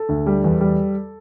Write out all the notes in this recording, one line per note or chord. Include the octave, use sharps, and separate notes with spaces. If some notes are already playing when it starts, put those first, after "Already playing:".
Already playing: A4
D2
G3
E2
G3